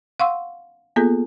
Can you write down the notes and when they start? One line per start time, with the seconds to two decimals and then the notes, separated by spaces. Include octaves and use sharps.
0.20 F5 F#5 C6 C#6 E6
0.96 A#3 B3 F4 G#4 A4